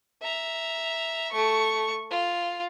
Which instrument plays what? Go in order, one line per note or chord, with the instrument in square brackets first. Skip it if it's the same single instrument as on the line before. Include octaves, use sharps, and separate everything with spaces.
[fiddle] E5 A#5
A3 C#6
F4